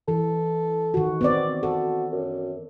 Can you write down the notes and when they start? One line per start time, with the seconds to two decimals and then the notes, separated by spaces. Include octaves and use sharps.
0.08 E3 A4
0.94 D#3 F#4
1.21 B3 C4 D5
1.63 F#4 A4
2.12 F#2